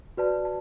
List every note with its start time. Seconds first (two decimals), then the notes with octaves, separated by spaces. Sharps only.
0.17 F#4 B4 D5 A5
0.45 A5